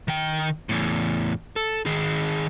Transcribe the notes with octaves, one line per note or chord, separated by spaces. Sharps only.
D#3 G5
E2 A2
A4
D#3 G#4